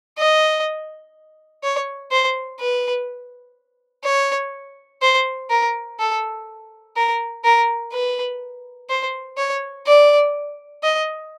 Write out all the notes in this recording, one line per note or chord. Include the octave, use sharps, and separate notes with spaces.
D#5
C#5
C5
B4
C#5
C5
A#4
A4
A#4
A#4
B4
C5
C#5
D5
D#5